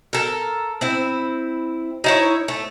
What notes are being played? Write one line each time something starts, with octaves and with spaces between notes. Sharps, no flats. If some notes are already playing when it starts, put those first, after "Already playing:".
A4 A#4
C4 E4
D#4 E4 C#5
A3